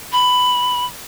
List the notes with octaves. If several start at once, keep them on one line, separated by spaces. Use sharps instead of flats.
B5